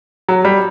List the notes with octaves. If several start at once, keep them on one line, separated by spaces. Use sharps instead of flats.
F#3
G3